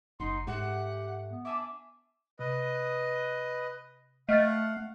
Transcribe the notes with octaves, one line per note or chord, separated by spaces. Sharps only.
F#1 D#4 F#4 C6
G#2 A3 C4 G4 F#5
B3
D4 E5 G#5 D6
C3 B4 D#5
A3 D#5 F5 F#5 F6 A6